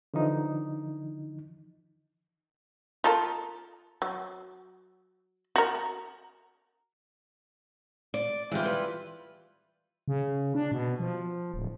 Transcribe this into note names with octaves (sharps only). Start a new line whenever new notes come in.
D3 E3 F3 D#4
F4 A4 A#4
F#3
F#4 A#4
D5
E3 G3 G#3 F4 G4
B4
C#3
D4
B2
F3
D1